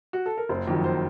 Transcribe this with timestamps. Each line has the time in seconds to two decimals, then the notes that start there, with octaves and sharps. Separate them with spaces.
0.13 F#4
0.26 A4
0.38 A#4
0.49 F#1 C5
0.68 F2 D#3 F#3
0.84 C5